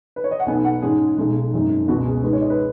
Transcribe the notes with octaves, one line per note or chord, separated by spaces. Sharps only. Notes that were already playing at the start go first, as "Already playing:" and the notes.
B4
C#5
D#5
F#5
B1 B2 B3 D#4 G#5
F#5
G#2 G#3 C#4 G#4
B1 B2 G#3 D#4
G#1 F#2 D#3 G#3 D#4
C#2 B2 B3 F#4
G#4
G#2 G#3 D#4 B4
C#5
D#5
B4